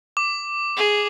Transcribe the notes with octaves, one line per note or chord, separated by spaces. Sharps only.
D6
G#4